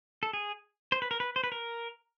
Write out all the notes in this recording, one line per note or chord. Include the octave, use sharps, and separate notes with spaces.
A4
G#4
C5
B4
A#4
B4
C5
B4
A#4